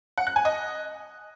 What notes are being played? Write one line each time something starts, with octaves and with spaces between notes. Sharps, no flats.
F#5
F#6
G#5
D#5